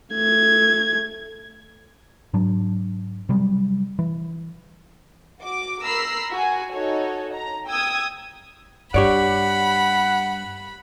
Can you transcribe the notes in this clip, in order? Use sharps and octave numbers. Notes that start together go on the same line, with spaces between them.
A3 G#6
G#2 F#3 D4
C3 F#3 G3
E3
F#4 D6
A#4 A#5 B5 E6 B6 C7
F#4 G#5
D#4 F#4 A4 C#5
A#5
G5 D#6 E6 G#6
G2 G4 C#5 D5 F#5 B5